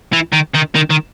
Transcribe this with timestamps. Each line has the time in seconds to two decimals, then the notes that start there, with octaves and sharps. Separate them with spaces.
0.13 E3
0.32 D#3
0.54 D#3
0.75 D#3
0.90 D#3